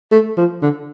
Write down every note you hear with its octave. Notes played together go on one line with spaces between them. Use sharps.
A3
F3
D3